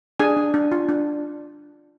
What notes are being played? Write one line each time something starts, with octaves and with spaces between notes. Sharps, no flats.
D4 G#4 G#5
D4
D4
F4
D4